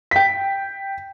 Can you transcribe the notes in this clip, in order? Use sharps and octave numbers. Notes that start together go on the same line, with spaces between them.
G5 B6